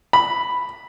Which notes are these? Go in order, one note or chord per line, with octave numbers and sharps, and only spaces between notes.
B5